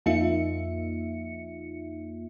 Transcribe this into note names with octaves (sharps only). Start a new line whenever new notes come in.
F2 A#3 D#4 F4 E5 C#7